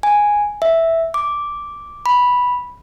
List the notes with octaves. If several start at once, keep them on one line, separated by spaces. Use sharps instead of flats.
G#5
E5
D6
B5